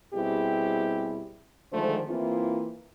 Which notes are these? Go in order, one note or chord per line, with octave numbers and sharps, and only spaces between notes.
B2 G3 C4 E4 G4 G#4
D3 D#3 F3 G#3 A3 C5
E3 A#3 C4 E4 F4